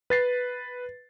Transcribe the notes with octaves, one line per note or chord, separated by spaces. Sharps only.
B4 A6 C7